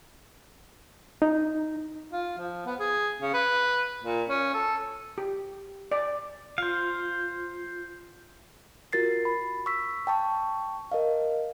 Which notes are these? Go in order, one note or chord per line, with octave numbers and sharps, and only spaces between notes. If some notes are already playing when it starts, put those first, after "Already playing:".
D#4
F4
F3
B3
G#4
C#3
B4
A#2
C#4
A4
G4
D5
F4 C5 F5
F4 F#4 A#4 A6 C7
B5
C#6 E6 B6
G5 A5 C#6
A#4 D#5 F5